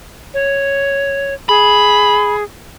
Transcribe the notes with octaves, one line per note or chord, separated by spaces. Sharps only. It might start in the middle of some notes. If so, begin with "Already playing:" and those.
C#5
G#4 B5